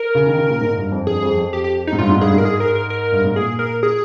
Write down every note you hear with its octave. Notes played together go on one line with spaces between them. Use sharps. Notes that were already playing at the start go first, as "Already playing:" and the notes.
Already playing: A#4
C#3
D#3
C#3
A#2
G#2
G2
F2
G2 G#4
F2
F2
G4
G4
D#4
G#2
G2 F4
G#2
G2 G#4
G#2 A#4
G#4
A#4
A#4
A#4
G2
G#2
A#2 G#4
A#4
G#4